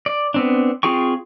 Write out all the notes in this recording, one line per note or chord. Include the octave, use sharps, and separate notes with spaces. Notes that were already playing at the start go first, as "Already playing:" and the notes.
D5
B3 C4 D4
C4 F4 G#4 G5 C#6